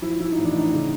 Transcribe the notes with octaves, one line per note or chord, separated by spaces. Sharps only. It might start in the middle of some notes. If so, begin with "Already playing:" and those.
F3 E4
F3 E4
D#4
A1
D4
A2 D#4
C#3